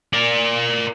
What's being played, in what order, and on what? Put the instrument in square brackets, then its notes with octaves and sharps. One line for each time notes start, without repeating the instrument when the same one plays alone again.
[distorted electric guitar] A#4 D5